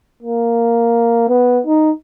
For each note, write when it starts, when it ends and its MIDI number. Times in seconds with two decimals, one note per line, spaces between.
0.23 1.27 58
1.29 1.60 59
1.66 1.91 63